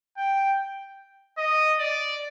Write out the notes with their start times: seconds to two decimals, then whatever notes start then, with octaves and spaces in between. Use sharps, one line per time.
0.18 G5
1.38 D#5
1.79 D5